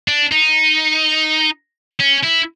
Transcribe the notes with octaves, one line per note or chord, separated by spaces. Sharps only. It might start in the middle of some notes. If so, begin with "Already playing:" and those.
D4
D#4
C#4
E4